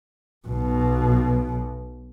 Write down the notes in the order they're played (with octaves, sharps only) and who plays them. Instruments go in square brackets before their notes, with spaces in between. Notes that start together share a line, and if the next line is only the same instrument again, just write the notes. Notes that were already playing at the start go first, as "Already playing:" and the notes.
[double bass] B1 B2